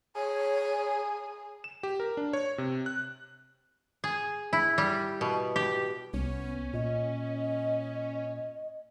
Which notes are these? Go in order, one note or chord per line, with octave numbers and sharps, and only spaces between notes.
G#4 C#5
E7
G4
A#4
D4
C#5
C3
F#6
G#4
E4
G3
B2
G4
C2 B3 C#4
A#2 D#5